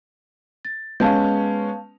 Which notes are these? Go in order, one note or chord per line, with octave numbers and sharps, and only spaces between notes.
A6
G#3 B3 C#4 F5 A5 G6